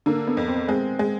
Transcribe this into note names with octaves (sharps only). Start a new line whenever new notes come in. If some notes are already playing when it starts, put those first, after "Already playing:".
D3 A#3
B3
F2
C4
G#3 C4
G#3